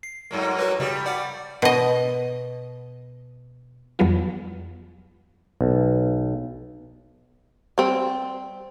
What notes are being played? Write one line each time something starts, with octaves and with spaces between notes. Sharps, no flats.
C7
G2 F#3 A#3
F#4 A#4 B4
G2 C#3 G3 F#4
D5 F#5 D6
B2 D#5
F2 E3 F#3 G3 B3 F4
B1
G3 C4